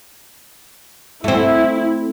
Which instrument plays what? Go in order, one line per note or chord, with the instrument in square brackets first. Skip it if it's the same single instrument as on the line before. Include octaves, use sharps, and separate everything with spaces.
[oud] A3 C4 [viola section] E4